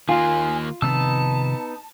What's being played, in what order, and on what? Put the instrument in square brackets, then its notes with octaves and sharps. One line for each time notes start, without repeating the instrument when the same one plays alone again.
[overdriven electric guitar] D#3 A#3 [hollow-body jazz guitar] F4 [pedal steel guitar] G#5
[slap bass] C3 D#3 F3 [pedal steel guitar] B3 D#4 E6 [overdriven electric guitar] A5